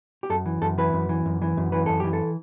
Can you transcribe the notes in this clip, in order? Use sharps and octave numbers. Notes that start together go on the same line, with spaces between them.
G4
F#2 A4
E3
F#2 A4
E3 B4
F#2
E3
F#2
E3
F#2
E3 B4
F#2 A4
E3 G4
A4